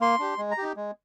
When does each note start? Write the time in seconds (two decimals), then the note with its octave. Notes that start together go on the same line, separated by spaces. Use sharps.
0.01 A#3 C6
0.19 D4 G4
0.38 G#3
0.51 A#5
0.58 D#4 G4
0.76 G#3